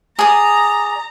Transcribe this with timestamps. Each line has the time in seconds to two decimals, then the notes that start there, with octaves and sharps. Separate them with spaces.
0.19 G#4 D5 A#5 D#6